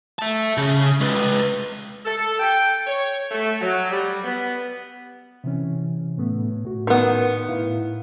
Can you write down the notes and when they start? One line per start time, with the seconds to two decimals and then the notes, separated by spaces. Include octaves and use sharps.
0.19 E5 A5
0.57 C#3
1.01 G#3 B4
2.05 A4
2.40 G5
2.86 C#5
3.31 A3
3.61 F#3
3.91 G3
4.25 B3
5.44 C3 E3 C#4
6.18 A2 A3 B3
6.65 A2 F#4
6.87 D#3 B3
7.48 A2 E4 F5